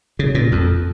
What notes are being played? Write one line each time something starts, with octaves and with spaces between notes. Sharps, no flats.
C#3
A#2
F2